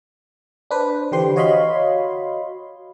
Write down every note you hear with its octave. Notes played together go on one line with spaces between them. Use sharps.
D4 B4 C5
D3 E3 G4 C5 C6
F#4 C#5 D#5 F5 B5 C6